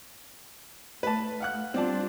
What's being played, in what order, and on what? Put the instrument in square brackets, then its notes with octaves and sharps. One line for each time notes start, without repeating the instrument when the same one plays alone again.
[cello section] A3 [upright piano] B4 A5
[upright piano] F5 F#5 F#6
[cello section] G3 D4 F4 [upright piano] C4 D5 A5